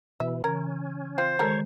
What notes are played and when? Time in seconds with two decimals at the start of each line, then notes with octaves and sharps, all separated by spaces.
0.20 B2 E3 E5
0.44 C#3 E3 C#4 A#4 G#6
1.18 F3 C4 F4 C5
1.39 D#3 G3 G#3 A4 A#4 C#5